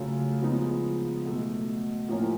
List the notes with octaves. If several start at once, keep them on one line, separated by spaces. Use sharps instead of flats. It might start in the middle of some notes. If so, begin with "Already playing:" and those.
Already playing: C#3 F#3 A3 C#4 F4
F3 G#3 B3 D#4
B2 F#3 A3
A2 F3 A#3 C#4